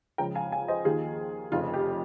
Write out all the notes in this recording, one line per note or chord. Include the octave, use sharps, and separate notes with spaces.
C#2 C#3 F3 G5 A#5
F5 G#5
F5 G#5
C5 D#5
D#2 D#3 F4 G#4
F1 F2 C#3 F3 F4
G4